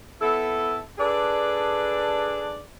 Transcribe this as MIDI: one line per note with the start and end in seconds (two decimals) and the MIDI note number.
0.21 0.79 59
0.21 0.79 64
0.21 0.79 69
0.98 2.60 62
0.98 2.60 68
0.98 2.60 69
0.98 2.60 71
0.98 2.60 74